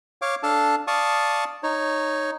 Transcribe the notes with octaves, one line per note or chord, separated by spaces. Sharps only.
C#5 F5 D6
D4 A4 F5 A5
D5 F5 A5 C#6 D#6
D#4 C#5